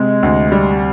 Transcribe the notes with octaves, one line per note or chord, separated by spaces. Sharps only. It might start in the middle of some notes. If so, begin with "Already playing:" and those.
Already playing: C3 G#3
D2
G3